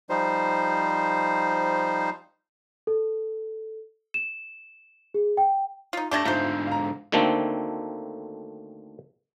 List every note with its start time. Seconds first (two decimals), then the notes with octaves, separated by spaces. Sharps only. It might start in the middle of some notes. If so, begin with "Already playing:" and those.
0.10 F3 G3 D#4 C5
2.87 A4
4.14 E7
5.14 G#4
5.37 G5
5.93 D#4 F4
6.11 A3 D4 G4 A5 G#6 A#6
6.25 G#2 D3 A3 D#4 F4 C5
6.67 F5 A#5
7.12 D2 D3 D#3 A3 A#3 C4